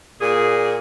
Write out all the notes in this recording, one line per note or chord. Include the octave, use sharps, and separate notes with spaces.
A#2 G#4